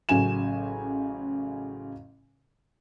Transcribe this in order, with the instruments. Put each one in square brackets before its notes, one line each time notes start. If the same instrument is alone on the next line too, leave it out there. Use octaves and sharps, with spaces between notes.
[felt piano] A1 C#3 F#3 G#5 E7